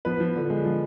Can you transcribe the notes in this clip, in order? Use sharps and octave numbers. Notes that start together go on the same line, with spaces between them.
F3 B3 B4
F3
D3
G#3
F3